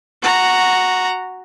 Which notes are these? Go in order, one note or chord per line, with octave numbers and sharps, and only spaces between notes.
F#4 A#5